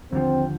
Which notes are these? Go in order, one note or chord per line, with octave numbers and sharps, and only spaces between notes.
D#2 D3 F3 C4